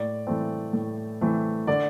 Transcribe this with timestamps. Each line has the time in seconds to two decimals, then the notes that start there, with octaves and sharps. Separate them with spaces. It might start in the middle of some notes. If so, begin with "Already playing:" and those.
Already playing: A2 D5
0.27 E3 A3 C4
0.73 A2
1.21 E3 A3 C4
1.67 D3 D5